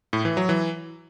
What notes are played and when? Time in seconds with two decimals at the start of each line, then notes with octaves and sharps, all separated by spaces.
0.13 A2
0.25 E3
0.37 F#3
0.49 E3